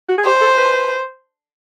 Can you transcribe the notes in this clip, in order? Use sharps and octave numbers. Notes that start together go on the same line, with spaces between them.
F#4
G#4
G4 C5
A4
B4